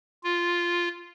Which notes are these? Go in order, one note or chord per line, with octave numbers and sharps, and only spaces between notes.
F4